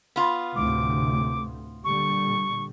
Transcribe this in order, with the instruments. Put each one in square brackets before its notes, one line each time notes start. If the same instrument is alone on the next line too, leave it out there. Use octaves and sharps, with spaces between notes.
[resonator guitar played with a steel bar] B3 F4
[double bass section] D2 A2 C3 [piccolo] D6
[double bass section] A#2 D3 G3 [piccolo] C#6